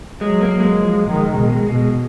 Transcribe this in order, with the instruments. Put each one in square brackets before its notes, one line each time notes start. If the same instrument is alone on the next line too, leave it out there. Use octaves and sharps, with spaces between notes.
[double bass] F#3 [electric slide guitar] G#3
[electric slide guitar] A#3
G#3
[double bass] F3
D#3
B2
B2